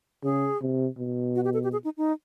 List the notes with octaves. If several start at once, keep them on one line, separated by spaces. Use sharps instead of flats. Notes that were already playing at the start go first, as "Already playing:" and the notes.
C#3 G#4
C3
B2
F#4
G4
A4
G4
G#4
D#4
D#4